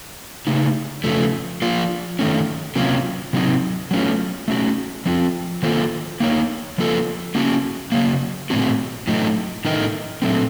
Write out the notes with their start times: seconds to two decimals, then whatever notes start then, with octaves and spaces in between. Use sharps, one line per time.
0.47 C#3 A3 D#4
1.04 C#3 F3 A3
1.62 F3 A#3 F4
2.19 D#3 A3 C#4
2.76 C3 F#3 A#3 C#4 F4
3.33 C3 F#3 C4 D#4
3.91 F#3 A3 C#4 F4
4.48 A3 C#4 F#4
5.06 F3 C4 F4
5.63 D#3 A#3 F4 A4 C5
6.20 A#3 D#4 A#4 C#5
6.78 F3 A#3 F4 A4
7.35 A#3 C#4 F#4
7.92 C#3 F#3 A#3
8.50 A#2 A3 C4 F#4
9.08 A2 F#3 A3 D#4
9.65 A2 A3 D#4 A#4 D#5
10.22 A#2 F#3 A3 C4